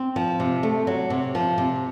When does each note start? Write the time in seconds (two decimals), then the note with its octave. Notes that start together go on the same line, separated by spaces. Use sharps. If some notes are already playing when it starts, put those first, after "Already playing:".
Already playing: C4
0.16 F3
0.40 C3
0.63 A3
0.87 F#3
1.10 C3
1.35 F3
1.58 C3